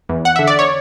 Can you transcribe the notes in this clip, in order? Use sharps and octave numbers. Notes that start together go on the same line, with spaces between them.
E2
F#5
D3 E5
D5
C#5